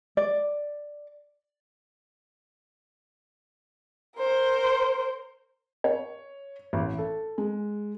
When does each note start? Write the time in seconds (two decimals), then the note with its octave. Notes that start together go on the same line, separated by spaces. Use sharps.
0.17 D5
4.17 A#4 C5
5.84 C#5
6.73 A1
6.98 A4
7.38 G#3